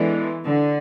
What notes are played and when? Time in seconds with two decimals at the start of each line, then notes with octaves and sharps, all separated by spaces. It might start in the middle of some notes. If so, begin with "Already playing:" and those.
Already playing: E3 G#3 B3 D4 A4
0.46 D3